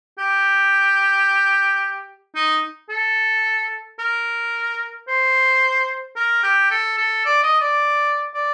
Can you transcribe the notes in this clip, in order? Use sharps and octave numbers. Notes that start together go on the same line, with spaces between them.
G4
D#4
A4
A#4
C5
A#4
G4
A4
A4
D5
D#5
D5
D5